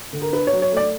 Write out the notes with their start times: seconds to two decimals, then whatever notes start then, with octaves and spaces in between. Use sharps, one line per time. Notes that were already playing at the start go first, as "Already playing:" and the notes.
0.13 D3
0.22 A#4
0.32 D4 B4
0.47 C#5
0.52 F#3
0.62 C#5
0.72 A3 D5